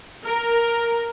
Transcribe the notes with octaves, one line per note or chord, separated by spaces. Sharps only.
A#4